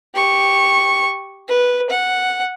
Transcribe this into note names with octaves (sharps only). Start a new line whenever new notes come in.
G4 C#6
B4
F#5